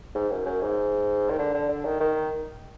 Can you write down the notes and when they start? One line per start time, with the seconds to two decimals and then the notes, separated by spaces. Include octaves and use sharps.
0.15 G#2
0.31 F#2
0.46 F#2
0.61 G#2
1.30 D#3
1.39 D3
1.54 D3
1.69 D3
1.85 D#3
2.01 D#3